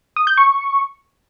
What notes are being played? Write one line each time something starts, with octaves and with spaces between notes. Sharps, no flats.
D#6
G6
C#6